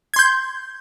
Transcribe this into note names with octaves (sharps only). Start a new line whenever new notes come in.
C6 G6 G#6